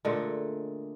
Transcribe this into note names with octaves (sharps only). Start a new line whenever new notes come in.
A#2 D3 G#3 A3